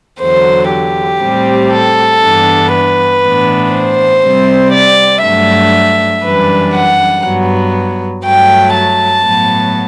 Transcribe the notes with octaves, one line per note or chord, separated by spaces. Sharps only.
E2 D3 F#3 C5
G4
A2 G3 C4
A4
G2 E3 B3 D4
B4
A2 E3 B3 D4
C5
C3 G3 C4
D5
G2 F#3 A3 D4 E5
F#2 E3 G3 D4 B4
F#5
G2 F#3 B3
G2 F#3 A3 G5
A5
A2 F#3 B3